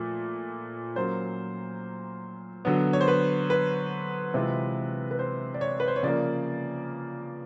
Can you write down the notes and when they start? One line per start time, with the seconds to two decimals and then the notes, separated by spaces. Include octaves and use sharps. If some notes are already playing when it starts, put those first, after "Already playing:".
Already playing: A#2 F3 A3
0.96 F#3 A#3 C#4 C5
2.65 D3 F#3 B3
2.93 C#5
3.01 C5
3.08 B4
3.50 B4
4.34 C3 E3 G#3 C4 F4
5.11 B4
5.19 C5
5.54 D5
5.61 C#5
5.80 B4
5.88 C5
5.96 C#5
6.03 C#3 F3 A#3 D5